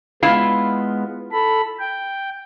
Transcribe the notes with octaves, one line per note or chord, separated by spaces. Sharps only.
G#3 B3 E4 F4 F5
A4 B5
G5